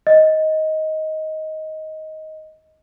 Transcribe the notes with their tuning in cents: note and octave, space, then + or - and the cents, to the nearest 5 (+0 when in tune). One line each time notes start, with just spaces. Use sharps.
D#5 +10